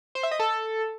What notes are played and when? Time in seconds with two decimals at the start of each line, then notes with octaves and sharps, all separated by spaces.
0.15 C5
0.23 E5
0.31 D#5
0.39 A4